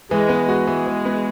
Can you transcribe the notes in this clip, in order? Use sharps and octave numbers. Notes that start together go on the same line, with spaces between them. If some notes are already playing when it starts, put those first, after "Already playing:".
E3 G#3
B3
F#4
E3 G#3
E3
B3